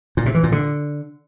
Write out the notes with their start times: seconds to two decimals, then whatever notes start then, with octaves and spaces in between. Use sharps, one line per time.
0.17 A#2
0.26 C3
0.35 E3
0.43 A#2
0.52 D3